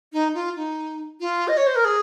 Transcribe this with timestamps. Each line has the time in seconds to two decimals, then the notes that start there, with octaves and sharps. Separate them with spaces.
0.13 D#4
0.34 F4
0.56 D#4
1.20 F4
1.48 D#5
1.57 C#5
1.66 C5
1.75 A#4
1.85 G#4